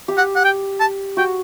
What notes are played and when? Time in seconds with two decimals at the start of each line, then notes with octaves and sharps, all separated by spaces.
0.08 G4
0.18 F#5
0.36 F#5
0.44 G5
0.80 A5
1.17 F#4 G5